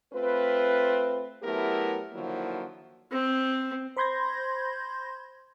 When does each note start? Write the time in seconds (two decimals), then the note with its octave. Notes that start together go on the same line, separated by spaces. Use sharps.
0.13 A3 C4 F4 B4
1.43 F#3 A3 B3 E4 G4 A#4
2.13 D3 D#3 F3 F#3 A#3 E4
3.12 C4
3.97 C5 B5 C6 G6 G#6 A#6